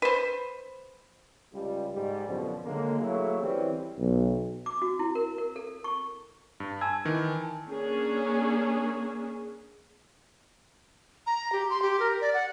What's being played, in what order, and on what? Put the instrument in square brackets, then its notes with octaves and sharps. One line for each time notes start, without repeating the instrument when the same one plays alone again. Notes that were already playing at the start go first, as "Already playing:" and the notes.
[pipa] B4 C5
[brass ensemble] C#2 G3
G#2 G3
F#2 B2 D3 F3
D3 D#3 F#3 G#3 A#3
F#3 A3 A#3 E4 G#4
E3 G3 C4 C#4 E4 G4
[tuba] B1
[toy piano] D6
F#4
E4
A#4
A#4
A4
C#6
[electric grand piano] G2
[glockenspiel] G#5 A5 E6 [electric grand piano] G#6
[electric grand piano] D#3 E3
[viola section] A#3 C#4 D4 G#4
[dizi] A#5
G4
C6
G4
A#4
D5
F#5